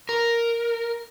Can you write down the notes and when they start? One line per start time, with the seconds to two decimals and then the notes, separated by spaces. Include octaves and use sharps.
0.09 A#4